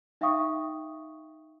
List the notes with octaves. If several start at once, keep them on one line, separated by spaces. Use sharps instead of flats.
D#4 E5 F5 G5 C#6 D#6